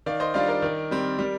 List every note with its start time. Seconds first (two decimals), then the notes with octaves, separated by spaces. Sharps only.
0.06 D#3 D5 F5
0.20 C5 D#5
0.34 G3 D4 F4 D5 F5
0.48 A#4 D5
0.62 D#3
0.91 G3 C4
1.19 G3